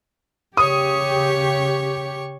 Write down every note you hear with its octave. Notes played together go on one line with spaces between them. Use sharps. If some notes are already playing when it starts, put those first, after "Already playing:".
C#3 G4 C#5 C#6 D#6